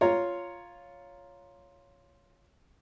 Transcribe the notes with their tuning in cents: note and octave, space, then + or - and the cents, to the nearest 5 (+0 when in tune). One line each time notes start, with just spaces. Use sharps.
F4 +0 C#5 +5 A#5 +0